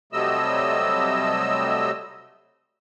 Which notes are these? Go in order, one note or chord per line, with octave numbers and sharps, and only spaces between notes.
C3 F#3 G3 A3 D#5 E6